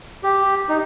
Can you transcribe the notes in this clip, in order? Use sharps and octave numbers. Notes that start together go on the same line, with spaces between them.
G4
D#4